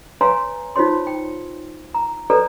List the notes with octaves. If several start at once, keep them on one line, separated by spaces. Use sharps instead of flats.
B4 C#5 F5 G#5 A#5 C6
D#4 F4 C5 C#5 C6
G5
A#5
A4 B4 C#5 D5 A#5